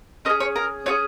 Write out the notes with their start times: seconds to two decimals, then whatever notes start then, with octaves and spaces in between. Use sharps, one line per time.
0.25 C#4 A#4 D#5
0.29 G#4
0.40 C#5
0.56 A#4
0.86 C#4 F4 G#4 C#5